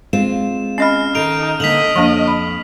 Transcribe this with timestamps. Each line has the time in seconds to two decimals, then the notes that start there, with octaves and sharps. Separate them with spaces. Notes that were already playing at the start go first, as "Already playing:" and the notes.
0.13 G#3 C4 F4 E7
0.78 C#4 D#5 B5 F6 C7
1.15 D#3 D#4 A4 D7 F7
1.60 D3 A#3 D#5 B6 F7 F#7
1.96 F2 F3 A#3 D4
2.28 B5